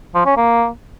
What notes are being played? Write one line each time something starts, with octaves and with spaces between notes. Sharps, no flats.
F3
C#4
A#3